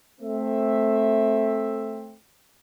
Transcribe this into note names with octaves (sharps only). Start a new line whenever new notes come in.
A3 C4 E5